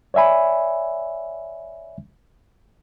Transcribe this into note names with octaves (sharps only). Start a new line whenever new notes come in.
C#5 D5 E5 G#5 B5